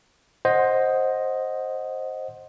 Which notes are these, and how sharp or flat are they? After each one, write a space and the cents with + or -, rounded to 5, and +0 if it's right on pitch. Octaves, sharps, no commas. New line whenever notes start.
C5 +10 D#5 +0 F#5 +0